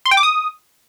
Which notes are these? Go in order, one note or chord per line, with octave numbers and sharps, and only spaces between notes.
C6
G5
D6
D#6